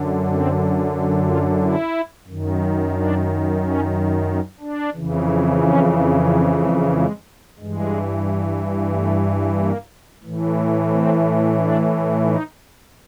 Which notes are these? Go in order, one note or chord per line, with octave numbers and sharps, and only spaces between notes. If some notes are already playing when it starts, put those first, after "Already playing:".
Already playing: F#2 D3
C4
F4
E4
F#2 D#3
D4
C#4
C#4
D4
F2 C#3 E3
C#4
C4
G#3
G#3
G2 E3 G#3
A3
A#3
A2 E3
C4
D4
D#4